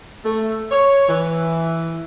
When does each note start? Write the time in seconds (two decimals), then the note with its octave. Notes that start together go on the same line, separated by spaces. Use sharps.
0.24 A3
0.71 C#5
1.09 E3